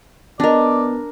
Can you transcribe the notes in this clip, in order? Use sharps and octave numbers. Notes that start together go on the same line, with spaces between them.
D#3 B3 D4 G#4 A#4 D5 D#5